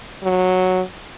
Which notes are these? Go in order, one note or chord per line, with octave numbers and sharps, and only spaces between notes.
F#3